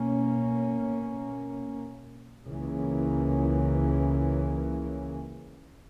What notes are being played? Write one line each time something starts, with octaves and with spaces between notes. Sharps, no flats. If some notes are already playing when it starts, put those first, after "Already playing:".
Already playing: B2 A#3 C#4
C#2 C#3 E3 A#3 C#4